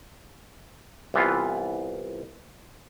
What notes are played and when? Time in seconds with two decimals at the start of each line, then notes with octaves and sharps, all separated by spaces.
1.14 C2 E3 B3 F4